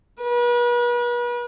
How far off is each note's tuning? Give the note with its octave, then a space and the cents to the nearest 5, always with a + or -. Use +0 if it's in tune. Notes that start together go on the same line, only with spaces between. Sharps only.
B4 -40